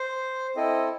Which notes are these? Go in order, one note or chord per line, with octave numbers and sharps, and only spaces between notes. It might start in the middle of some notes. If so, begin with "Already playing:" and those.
Already playing: C5
C4 E4 A4 D#5